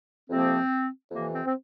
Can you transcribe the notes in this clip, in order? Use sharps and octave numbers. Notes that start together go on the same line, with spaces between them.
F2 C3 F3 A#3 C4
F2 C3 E3 A#3
C4
C4